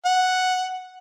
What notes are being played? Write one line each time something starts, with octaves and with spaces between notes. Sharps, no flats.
F#5